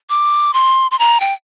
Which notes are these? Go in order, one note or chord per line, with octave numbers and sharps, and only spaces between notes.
D6
C6
C6
A#5
G5